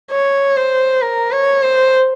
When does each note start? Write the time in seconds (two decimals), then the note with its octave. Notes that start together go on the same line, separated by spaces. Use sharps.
0.11 C#5
0.57 C5
1.02 A#4
1.32 C#5
1.62 C5